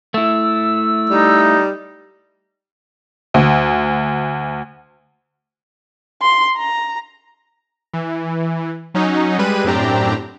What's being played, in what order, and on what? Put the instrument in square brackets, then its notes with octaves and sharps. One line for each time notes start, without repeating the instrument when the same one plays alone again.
[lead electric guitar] A3 E4 [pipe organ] E6
[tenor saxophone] G3 [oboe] D#4
[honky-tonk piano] D2
[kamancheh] C6
A#5
[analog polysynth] E3
F#3 C#4 D#4
G3 G#3 B4 D#7
F#2 A2 C4 D4 G4 A#5